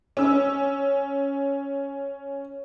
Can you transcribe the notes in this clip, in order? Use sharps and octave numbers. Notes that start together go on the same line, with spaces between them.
C#4 E6